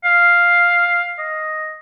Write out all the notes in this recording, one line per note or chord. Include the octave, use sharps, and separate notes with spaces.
F5
D#5